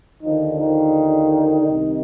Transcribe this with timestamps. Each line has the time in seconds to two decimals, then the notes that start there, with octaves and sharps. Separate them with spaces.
0.23 D#2 D3 D#3 F3 D#4
0.59 D#3 D#4
1.67 C2 C3 D#3